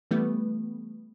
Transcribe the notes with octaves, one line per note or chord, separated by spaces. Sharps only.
E3 G3 A3 B3